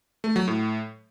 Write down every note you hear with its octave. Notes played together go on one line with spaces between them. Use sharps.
A3
F#3
A2